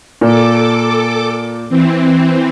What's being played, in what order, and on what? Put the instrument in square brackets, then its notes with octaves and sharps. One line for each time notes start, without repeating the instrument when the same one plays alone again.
[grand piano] A#2 [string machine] A4 D6
[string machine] E3 C4